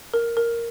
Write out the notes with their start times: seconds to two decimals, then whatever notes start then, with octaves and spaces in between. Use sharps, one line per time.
0.14 A#4
0.37 A#4